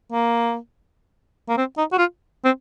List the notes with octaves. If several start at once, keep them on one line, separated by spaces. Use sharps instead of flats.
A#3
A#3
C4
D#4
F#4
F4
C4